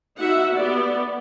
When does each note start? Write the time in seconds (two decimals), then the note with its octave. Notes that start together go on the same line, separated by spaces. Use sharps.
0.18 B3 D#4 F#4 E5 F#5
0.55 B3 G4 D5